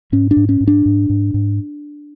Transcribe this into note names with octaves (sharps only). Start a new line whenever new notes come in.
G#2 C#4
D4
G#2
C#4
G#2
D4
G#2
G#2
G#2